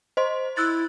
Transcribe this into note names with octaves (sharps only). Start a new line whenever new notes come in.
C5 D#5 C6
E4 E6 F#6 A6